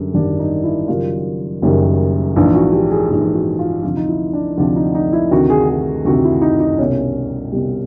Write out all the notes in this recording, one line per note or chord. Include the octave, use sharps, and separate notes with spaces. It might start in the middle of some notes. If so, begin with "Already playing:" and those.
Already playing: F#2 D3 G3 C#4
G#1 F#2 D3 G3 D4
D#4
E4
F#1 F#2 D#3 G3 F4
F#1 F#2 D#3 G3
A#1 G#2 E3 F4
F#4
G4
G#4
A#1 G#2 E3 G4
F#4
F4
D2 C3 F3 F4
D#4
E4
D4
D2 C3 F3 D4
D#4
D#4
E4
D2 C3 D#3 F#4
G#4
G#4
D2 C3 D#3 F#4
E4
D#4
D#4
C2 B2 G3 C#4
C2 B2 G3